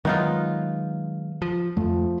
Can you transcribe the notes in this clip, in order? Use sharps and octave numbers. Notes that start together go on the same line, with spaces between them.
D#3 F#3 G#3 B3 D#4 F4
F3
F2 F3 A3